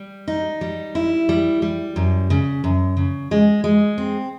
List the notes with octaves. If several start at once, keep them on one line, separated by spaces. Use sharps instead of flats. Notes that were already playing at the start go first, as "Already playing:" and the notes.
Already playing: G3
D#4
G3
E4
G3
G3
F#2
C#3
F#2
C#3
G#3
G#3
C4